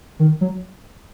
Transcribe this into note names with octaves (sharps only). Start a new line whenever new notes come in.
D#3
F#3